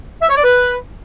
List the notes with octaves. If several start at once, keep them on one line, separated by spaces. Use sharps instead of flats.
E5
C#5
D5
B4